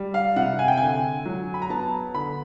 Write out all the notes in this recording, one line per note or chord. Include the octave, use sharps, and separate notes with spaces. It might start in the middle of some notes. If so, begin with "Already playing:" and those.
Already playing: G3
F5
C3 F#5
G#5
G5
D3 G#5
F#3
B5
A#5
B3 A5
D3 B5